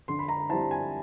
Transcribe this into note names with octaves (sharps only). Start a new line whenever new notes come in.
D3 C6
B5
A#5
G3 C4 E4 A5
G#5